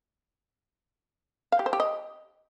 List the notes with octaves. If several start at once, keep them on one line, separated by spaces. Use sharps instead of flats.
F5
G4
C5
G4
D#5